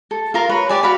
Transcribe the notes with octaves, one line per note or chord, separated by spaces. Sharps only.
A4
F4 A#4 C6
B4 C#5 B5
G4 D5 G#5
F#4 F5 B5